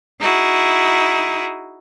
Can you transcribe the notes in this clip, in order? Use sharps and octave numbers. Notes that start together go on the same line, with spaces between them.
D#4 E4 F#4 G#4